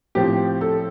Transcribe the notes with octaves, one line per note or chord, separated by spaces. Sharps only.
A2 F3 C4 G4
A4